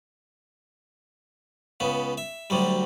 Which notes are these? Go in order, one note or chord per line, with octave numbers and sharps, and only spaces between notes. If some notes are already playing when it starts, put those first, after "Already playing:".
C#2 C#3 B3
E5
D2 C3 F#3 G3